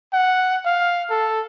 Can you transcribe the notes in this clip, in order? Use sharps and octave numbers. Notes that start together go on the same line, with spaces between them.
F#5
F5
A4